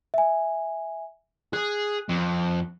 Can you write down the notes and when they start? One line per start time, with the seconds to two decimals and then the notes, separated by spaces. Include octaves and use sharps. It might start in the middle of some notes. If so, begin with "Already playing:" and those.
0.14 E5 G#5
1.53 G#4 F#6
2.09 F2